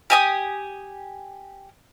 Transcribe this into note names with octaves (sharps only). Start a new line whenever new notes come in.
G4 G#5 D#6